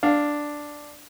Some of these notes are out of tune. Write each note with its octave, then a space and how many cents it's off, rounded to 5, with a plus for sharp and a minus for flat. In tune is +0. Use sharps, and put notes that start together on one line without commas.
D4 +0 F5 +0